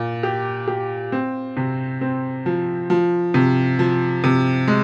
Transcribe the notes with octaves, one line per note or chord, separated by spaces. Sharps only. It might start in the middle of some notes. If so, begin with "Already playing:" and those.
Already playing: A#2
G4
G4
C4
C3
C4
F3
F3
C3
F3
C3
G#3